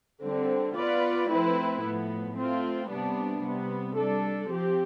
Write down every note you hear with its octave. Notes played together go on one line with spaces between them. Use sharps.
D3 G3 C4
B3 F4 B4 D5
F3 A3 C4 E4 B4
A2 F3 B3
A3 C4 F4
C3 G3 B3 D4
C3 G3 B3
G3 D4 A4
F3 C4 G4